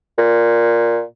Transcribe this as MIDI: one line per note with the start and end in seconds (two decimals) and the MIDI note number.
0.18 1.02 46